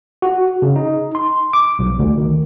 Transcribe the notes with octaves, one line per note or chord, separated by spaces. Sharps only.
F#4
C#3
D#4
C6
D6
B1
D2
D#3